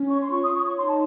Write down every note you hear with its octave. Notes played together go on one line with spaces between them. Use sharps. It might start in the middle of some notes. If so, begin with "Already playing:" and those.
Already playing: C#4
C#5 C#6
C6
F4 C#6
D#6
C#5 C#6
C#6
D#4 C6
A5